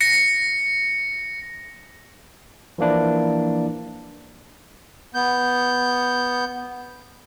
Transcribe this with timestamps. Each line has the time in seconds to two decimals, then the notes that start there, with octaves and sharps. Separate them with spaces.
0.01 A#6 C#7
2.78 E3 F3 A#3 D4 E4
5.14 B3 G6